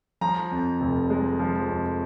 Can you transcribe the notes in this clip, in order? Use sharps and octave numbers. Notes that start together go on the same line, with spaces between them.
F3 A#5
F2
F1
G#3
F3
F2